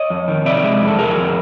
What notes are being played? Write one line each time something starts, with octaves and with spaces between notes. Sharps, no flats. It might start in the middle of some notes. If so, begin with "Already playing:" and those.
Already playing: C#5 D#5
F2
D#3
C3 D5 E5
G#3
F2
A4
F2 G#4 A#4
F2